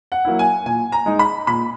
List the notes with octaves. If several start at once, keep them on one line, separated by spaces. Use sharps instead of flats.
F#5
F#3 A#3 E4
G#5
A#2 G#5
A#5
G#3 D#4
B5
A#2 B5